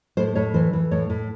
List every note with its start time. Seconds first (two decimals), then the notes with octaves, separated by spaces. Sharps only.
0.17 A2 C5
0.35 A2 C#5
0.54 E3 C5
0.73 E3
0.91 A2 C#5
1.10 A2